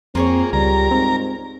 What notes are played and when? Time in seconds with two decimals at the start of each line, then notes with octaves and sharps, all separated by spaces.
0.15 F2 A#3 C4 F4 G#4 C#5
0.53 C#2 G3 A#4 A#5
0.91 G#2 C4